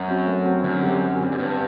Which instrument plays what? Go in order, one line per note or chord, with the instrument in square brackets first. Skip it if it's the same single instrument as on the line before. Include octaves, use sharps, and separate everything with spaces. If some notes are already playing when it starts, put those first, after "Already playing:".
Already playing: [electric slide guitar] F#2
[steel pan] C4 F#4
A3
C4 F#4
[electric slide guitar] F#2 [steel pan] D3
[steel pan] G3 C4 G4
D3
G3 C4 G4
[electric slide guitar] F#2
[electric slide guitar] G2 [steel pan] B3